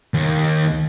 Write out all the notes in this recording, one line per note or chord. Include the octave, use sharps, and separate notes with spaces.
D#2